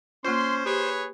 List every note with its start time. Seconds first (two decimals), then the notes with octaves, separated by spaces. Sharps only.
0.25 A#3 C#4 F4 C5 C6
0.66 G4 G#4 B4 C#5